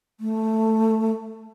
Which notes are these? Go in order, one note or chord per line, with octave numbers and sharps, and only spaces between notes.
A3